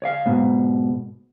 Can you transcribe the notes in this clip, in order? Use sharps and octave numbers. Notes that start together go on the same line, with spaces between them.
C#5 D5 F5
G#2 B2